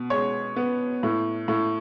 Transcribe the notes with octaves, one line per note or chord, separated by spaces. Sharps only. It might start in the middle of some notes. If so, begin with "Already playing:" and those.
Already playing: B2
G#3 C#5
B3
A2
A2